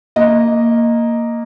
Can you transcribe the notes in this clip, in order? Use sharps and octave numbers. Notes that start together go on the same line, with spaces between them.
A#3 D#5